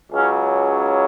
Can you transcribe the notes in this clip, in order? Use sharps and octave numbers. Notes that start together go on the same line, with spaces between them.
C#2 C#3 F#3 C#4